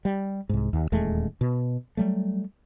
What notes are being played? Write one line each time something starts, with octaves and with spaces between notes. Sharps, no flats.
G3
C2 G#2
D#2
D#1 E2 G#3 A3
B2
F#3 G3 A3